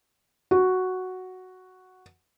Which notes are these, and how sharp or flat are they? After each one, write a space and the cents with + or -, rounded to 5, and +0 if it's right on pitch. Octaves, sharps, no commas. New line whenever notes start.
F#4 +0